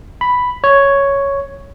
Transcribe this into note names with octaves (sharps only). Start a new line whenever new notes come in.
B5
C#5